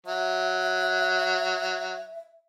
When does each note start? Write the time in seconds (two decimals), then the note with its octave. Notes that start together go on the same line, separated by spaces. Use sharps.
0.07 F#3 E5